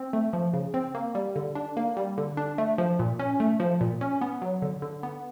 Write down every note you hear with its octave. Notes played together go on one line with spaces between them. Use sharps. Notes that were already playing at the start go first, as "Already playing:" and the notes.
Already playing: C4
A3
F3
C#3
C4
A#3
G3
D3
D4
A#3
G3
D3
D4
A3
F3
A#2
C#4
A3
F3
A#2
C#4
B3
F#3
D3
D3
B3